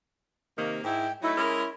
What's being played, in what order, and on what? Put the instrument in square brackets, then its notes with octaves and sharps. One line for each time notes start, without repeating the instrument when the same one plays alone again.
[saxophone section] C3 D#3 A#3
[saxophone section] G#2 E4 [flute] G5
[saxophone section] F#3 A3 D#4 [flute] E4
[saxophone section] G#3 C#4 A#4